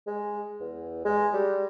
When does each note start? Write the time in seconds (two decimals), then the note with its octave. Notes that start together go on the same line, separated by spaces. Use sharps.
0.07 G#3
0.60 E2
1.05 G#3
1.33 G3